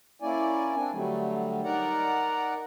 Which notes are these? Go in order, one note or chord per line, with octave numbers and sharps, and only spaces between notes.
A#3 C#4 E4 D5 G#5
C4 D4 G#5
D3 F#3 G3 A3
D#4 A#4 D5 F#5 A#5